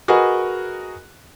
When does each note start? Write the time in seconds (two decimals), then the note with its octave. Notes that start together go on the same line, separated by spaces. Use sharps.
0.08 F#4 G#4 A#4 B4 D#5 F#5